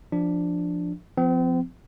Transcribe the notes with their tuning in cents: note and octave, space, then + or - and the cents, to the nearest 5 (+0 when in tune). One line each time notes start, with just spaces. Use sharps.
F3 +0 D4 +0
F3 +0 C4 -40